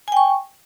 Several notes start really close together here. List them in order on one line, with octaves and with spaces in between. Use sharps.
G#5 G5 C#6